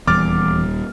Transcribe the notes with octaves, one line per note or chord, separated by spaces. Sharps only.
D#1 E2 G3 D6 F6 A6